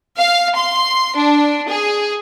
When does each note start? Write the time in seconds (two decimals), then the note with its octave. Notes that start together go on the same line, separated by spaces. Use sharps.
0.17 F5
0.55 C6
1.16 D4
1.69 G#4